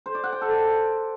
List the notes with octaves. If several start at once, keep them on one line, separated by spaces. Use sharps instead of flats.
C5
D5
F#5
G5
A4